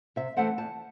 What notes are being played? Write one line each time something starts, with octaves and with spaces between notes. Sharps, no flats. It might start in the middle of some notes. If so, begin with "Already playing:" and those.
C3 E5
E3 A3 C4 F#5
E2 A5